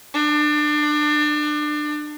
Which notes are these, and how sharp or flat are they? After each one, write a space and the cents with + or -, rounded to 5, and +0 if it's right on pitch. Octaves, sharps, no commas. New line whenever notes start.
D4 +30